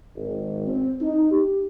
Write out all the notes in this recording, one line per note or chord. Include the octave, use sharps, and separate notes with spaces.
G#1
C4
D#4
G4